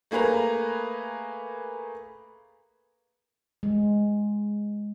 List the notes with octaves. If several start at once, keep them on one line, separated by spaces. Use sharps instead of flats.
A3 A#3 G#4 B4 A#5
G#3